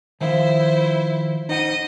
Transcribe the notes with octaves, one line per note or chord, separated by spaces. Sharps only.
D#3 F3 E4 C5 F5
D#4 C5 D#5 F#5 D#7